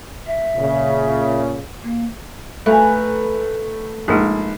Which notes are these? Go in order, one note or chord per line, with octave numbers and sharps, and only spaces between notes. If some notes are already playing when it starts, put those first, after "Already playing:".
E5
A#2 C#3
A#3
A3 B4 E5 F5 G#5 A#5
A#1 G#3 D#4 G#4